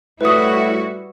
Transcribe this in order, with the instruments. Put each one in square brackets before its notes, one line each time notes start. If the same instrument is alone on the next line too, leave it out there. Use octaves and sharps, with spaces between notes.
[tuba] A2 [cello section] G3 E4 F#4 [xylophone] B4 D#6